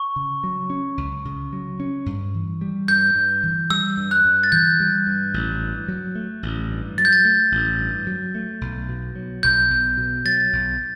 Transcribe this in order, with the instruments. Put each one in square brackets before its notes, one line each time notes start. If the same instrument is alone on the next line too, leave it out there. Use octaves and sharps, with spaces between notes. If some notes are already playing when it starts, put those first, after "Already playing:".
Already playing: [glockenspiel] C#6
[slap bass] C#3
F#3
C#4
C#2
C#3
F#3
C#4
G2
E3
G3
[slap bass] G2 [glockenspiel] G6
[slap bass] G2
E3
[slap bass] G3 [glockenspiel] E6
[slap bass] G2
[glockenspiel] F#6
[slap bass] G2
[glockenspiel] A6
[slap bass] E3 [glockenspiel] G6
[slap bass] G3
G2
A1
G2
F#3
A3
A1
G2
[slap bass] F#3 [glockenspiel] A6
[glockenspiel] G6
A6
[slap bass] A3
A1
G2
F#3
A3
B1
B2
F#3
[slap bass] B1 [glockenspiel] G6
[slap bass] B1
B2
[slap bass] F#3 [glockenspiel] A6
[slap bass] B1